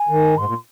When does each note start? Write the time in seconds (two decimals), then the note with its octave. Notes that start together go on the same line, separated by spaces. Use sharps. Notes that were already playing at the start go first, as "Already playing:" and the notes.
Already playing: G#5
0.09 D#3
0.36 G#2 C6
0.46 A#2